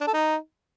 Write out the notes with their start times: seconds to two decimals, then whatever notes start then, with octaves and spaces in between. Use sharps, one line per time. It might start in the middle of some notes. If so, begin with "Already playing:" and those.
0.01 D4
0.07 A4
0.14 D#4